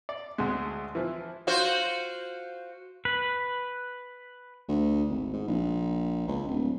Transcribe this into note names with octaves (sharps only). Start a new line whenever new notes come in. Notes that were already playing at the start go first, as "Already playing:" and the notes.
D5
D2 G#3
E3 F3 E4
F4 F#4 C5
B4
D2
G#1
G#2
A#1
C#2
D1